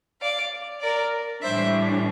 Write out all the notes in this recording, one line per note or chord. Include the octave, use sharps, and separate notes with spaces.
D5 F5
A#4 D5
A2 E3 G3 D4 C5 E5